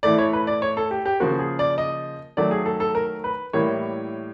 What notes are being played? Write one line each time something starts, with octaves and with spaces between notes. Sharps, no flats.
A2 E3 A3 D5
C#5
B4
D5
C#5
A4
G4
G4
C#3 F3 A#3 F#4
G#4
D5
D#5
D#3 F#3 A3 D5
G#4
A4
A4
A#4
B4
A2 E3 G3 A#3 C#5